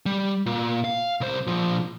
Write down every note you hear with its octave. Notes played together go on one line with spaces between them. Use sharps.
G3
A#2
F5
C2 C5
A#2 F3